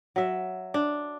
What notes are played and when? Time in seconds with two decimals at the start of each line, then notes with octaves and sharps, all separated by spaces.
0.16 F#3 E5
0.74 D4